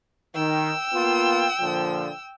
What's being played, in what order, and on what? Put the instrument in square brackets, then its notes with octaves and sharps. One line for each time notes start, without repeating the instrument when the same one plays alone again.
[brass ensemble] D#3 [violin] G5 E6
[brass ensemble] A#3 B3 F4
A#2 D3 F3